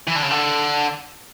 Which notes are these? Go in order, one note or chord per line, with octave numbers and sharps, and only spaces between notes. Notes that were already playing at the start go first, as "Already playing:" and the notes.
E3
D3
C#3
D3